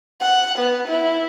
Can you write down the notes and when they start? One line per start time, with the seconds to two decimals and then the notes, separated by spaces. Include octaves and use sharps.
0.21 F#5
0.59 B3
0.88 E4